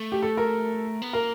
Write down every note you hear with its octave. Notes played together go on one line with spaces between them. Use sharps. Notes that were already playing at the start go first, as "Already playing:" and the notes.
Already playing: A3
G4
A4
A#4
B3
A#3 A#4